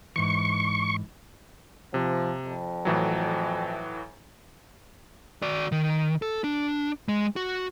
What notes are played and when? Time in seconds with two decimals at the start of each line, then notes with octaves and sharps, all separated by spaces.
0.16 G#2 E3 C#6
1.94 C3 F3
2.45 F2
2.85 A2 E3 F#3
5.42 F#4 D5
5.72 D#3
6.22 A4
6.44 D4
7.08 G#3
7.36 F#4